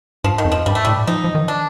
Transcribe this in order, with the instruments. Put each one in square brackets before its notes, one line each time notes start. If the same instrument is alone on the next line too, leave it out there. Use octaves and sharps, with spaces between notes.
[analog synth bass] G2 [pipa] F3
[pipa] D#3
[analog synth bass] F2
[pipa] F3
[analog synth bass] G2 [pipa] G3
[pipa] A3
[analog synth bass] A2 [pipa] G3
[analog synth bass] F3 [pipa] D#4
[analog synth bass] F3
D#3
[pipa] D4